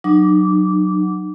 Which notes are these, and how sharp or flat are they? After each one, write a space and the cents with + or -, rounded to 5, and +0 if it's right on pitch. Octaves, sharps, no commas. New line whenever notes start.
F#3 +0 D#4 -45 D6 -15